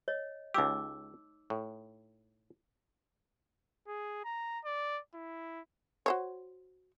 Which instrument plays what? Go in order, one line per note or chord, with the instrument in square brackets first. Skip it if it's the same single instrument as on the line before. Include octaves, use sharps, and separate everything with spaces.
[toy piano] C#5 D#5
[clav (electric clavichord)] C#2 G4 [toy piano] D#4 D6 E6
[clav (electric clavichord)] A2
[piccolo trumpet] G#4
A#5
D5
E4
[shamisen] F#4 C5 C#5